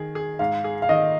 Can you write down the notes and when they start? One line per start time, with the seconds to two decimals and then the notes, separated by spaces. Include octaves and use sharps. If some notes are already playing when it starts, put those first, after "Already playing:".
Already playing: D#3 G#4
0.15 G#4
0.39 G#2 F5
0.64 G#4
0.82 F5
0.89 D#3 D#5